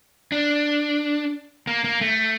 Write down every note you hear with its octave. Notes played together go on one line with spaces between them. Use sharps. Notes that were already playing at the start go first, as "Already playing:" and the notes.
D4
A#3
A#3
A3